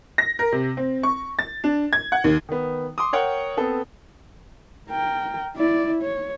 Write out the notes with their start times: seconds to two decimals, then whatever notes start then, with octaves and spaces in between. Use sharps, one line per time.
0.18 A#6
0.39 A#4
0.52 C3
0.77 C4
1.03 C#6
1.39 A6
1.64 D4
1.93 G#6
2.12 F#5
2.24 D#2
2.49 D#3 B3
2.98 C6 D6 D#6
3.13 A#4 C#5 F#5 G5
3.57 B3 C4 A4
4.90 A#4 G5
5.57 E4 D5
6.02 C#5